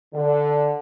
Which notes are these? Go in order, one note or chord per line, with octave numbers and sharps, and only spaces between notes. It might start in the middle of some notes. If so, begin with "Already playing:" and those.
D3